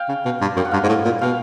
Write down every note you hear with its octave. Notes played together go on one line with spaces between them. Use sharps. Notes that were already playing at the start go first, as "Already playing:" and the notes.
Already playing: F5 G5
C#3
B2
G2
F#2 G5
F#5
G2 F5 G5
G#2
A2
A#2
B2 F5 G5